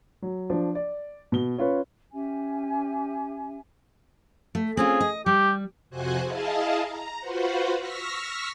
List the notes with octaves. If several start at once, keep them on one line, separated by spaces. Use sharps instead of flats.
F#3
F3 D4
D5
B2 G7
C#4 F4 B4 C#5
C#4 G4 E5 G#5
A3
C4 C#4 F4 G#4
D#5
G3 G4
F2 C3 F#4 C5 G#5 F#6
E4 G#4 D#5 F5 A5
A#5
F4 F#4 B4 C5 F#5
C#6 E6 F6 A#6 B6